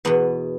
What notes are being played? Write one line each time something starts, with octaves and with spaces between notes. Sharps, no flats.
E2 B2 B3